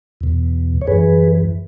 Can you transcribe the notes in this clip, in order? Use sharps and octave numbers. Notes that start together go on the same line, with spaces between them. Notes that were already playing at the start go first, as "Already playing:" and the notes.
E2 B2
C#5
F#2 E3 G#4 B4